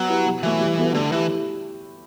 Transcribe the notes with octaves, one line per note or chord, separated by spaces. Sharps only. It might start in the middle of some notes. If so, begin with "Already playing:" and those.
Already playing: F#3 B3
E4 G4 B4
B2
E3 F#3 A3
G3
B3 F#4 A4
D3 A3
E3 E4 G4